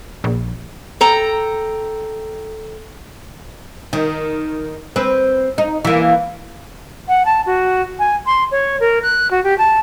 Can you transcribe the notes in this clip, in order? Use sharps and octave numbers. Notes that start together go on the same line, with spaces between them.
A#1
A4 G5 A#5
D#3
C4 B4
D#4
E3 A#3
F#5
A5
F#4
G#5
C6
C#5
A#4
F#6
F#4
G4
A5